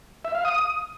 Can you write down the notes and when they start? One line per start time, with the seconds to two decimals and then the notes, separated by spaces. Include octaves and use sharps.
0.25 E5
0.35 F5
0.45 D#6